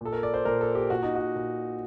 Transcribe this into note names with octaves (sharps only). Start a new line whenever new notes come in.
A#2 A4
A#4
D5
C5
A#2 A#4
A4
G4
A#2 F#4
D#4
F#4
A#2